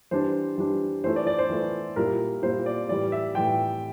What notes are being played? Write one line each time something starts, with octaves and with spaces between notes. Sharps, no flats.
E3 G3 D4 C5
E3 G3 D4
E3 A3 E4 C5
D5
D5
C5
E3 A3 E4
A#2 G3 A#3 E4 A#4
A#2 G3 A#3 E4 C5
D5
A2 E3 G3 D5
E5
A2 E3 G3 G5